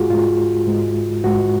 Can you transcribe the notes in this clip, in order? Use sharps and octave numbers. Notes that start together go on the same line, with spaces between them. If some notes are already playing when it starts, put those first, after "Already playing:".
Already playing: G#2 G#3 F4 F#4 G#4
G#2 G#3 F4
G#2 G#3
G#2 G#3 F#4